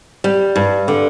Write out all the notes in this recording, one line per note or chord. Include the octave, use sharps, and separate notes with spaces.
G3
G2
D3